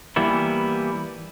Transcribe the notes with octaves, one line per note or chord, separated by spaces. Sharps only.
E3 G3 A#3 B3 E4